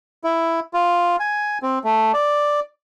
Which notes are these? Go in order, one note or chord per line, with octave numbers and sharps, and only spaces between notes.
E4
F4
G#5
C4
A3
D5